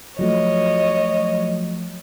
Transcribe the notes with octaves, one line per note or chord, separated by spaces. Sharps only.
F3 F#3 A3 C#5 D#5